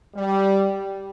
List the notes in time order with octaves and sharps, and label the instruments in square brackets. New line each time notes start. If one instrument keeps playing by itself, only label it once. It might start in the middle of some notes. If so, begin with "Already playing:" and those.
[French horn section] G3